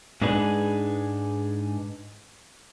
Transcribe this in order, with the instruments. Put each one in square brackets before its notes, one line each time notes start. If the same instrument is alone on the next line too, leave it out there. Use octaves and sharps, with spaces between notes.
[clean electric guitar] G#2 G#3 D4 D#4 G#4 B4